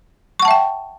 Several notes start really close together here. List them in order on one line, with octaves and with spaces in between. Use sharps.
C#6 F#5 A5 E5 G5